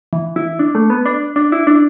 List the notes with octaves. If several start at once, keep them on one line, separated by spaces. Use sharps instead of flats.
E3
E4
D4
A3
B3
D4
D4
E4
D4